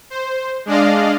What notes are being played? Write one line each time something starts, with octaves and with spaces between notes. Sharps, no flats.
C5
G#3 D4 D5 D#5 F5